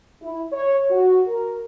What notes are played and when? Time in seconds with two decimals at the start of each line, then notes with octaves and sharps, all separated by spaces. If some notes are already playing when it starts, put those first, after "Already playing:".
0.22 E4
0.52 C#5
0.90 F#4
1.27 A#4